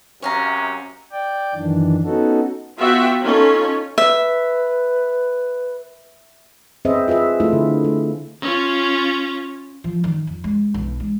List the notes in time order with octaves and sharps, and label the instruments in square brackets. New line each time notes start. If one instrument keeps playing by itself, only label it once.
[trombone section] F#2 C3 C#4 [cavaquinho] C#5 F5 A#5
[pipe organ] D5 G5
F#2 D#3 E3 D4
B3 C#4 D#4 F#4 A4
[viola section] B3 F4 F#4 E5 F#5 G5
C#4 D#4 F4 A4
[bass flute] B4 [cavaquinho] E5
[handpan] C4 G#4 B4 C5 D#5 E5
F4 G#4 B4 E5
A3 E4 F4 A4
D3
A3
[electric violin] C#4 F4
[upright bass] F3
D#3
F2
G#3
B1
G#3